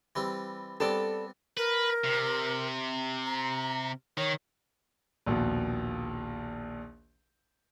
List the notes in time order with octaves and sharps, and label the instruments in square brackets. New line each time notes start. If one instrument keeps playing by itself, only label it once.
[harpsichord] E3 G3 C4
[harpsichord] G3 B3 C4 [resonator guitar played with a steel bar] A4 D5
[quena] A#4 [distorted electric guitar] B4
[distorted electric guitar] C3
[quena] A#5
[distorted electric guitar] D#3 [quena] C#5
[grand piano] A#1 D#2 B2